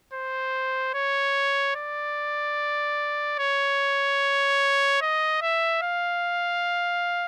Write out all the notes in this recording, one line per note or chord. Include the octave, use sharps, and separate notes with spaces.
C5
C#5
D5
C#5
D#5
E5
F5